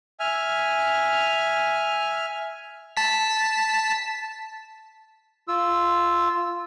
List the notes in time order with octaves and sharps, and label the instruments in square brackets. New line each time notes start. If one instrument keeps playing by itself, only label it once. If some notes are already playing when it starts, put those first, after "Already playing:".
[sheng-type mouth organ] E5 G#5 F6
[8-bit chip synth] A5 B6
[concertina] F4 E6